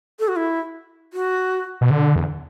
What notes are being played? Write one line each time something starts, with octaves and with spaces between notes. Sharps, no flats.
A4
F#4
E4
F#4
B2
D3
E2